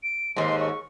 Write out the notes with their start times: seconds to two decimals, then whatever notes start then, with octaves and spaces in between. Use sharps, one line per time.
0.03 D7
0.37 D#2 G#2 C6
0.60 C#6